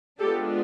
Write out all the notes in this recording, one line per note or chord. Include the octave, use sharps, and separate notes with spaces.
G#3 B3 D4 F4 G4 A4